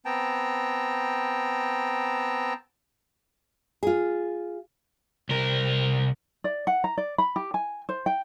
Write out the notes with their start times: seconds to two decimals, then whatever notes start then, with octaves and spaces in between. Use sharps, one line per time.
0.05 B3 C4 G5 A5 A#5
3.83 F4 G#4
5.29 C2 C3 A#4
6.44 D5
6.67 F#5
6.84 A#5
6.98 D5
7.18 B5
7.36 G4
7.54 G#5
7.89 C5
8.06 G5